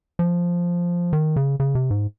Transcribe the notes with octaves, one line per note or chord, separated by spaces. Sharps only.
F3
D#3
C#3
C#3
C3
G#2